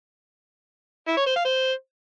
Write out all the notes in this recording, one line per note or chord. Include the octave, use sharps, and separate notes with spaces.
E4
C#5
C5
F5
C5